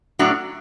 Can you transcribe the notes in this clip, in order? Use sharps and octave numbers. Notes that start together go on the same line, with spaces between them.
A2 F#3 D4 F#4